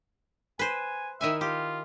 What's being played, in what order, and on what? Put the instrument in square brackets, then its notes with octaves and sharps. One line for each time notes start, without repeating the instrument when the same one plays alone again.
[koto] B4 C5 [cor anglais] G#5
[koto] D#3 E4 G#5 [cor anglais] E5
[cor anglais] F4 [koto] G4